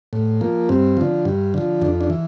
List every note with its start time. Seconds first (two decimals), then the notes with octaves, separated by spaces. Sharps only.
0.13 A2
0.41 F3 A#3
0.69 G2 C4
0.97 D3 F3
1.25 G2
1.54 D3 F3
1.82 F2 D4
2.01 D4
2.10 E3